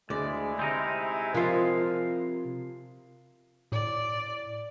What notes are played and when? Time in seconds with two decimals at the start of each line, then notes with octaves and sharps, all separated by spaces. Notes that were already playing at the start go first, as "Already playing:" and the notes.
0.10 D2 G#3 E4 G#4 D5
0.59 C3 C4 D#4 A#4
1.34 C3 F3 F4 A#4 C6
3.72 A2 D5